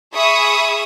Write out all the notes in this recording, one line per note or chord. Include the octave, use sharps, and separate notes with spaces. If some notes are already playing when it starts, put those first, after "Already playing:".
G#4 E5 B5 C#6 D#6